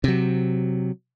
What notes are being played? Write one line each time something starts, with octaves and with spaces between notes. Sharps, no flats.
C3 F#3